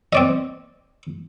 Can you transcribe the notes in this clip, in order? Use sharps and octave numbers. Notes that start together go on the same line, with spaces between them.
C4 D5 D#5